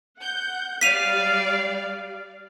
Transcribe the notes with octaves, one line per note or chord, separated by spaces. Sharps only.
F#5 G6
G3 D5 F5 B6 D#7 F7